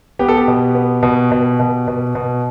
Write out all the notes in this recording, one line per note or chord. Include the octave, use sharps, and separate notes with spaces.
B3 G4
A4
G4
B2
B3
B2
B2
B2
B2
B2